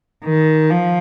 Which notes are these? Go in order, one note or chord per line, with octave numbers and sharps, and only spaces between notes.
D#3
F3